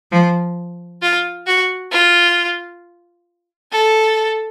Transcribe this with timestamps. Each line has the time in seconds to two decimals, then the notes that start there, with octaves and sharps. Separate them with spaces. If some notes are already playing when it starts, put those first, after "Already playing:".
0.11 F3
1.01 F4
1.46 F#4
1.92 F4
3.73 A4